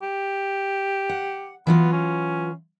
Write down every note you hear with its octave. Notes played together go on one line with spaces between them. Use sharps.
G4
F#5
E3 F#3 B3 F4
C#4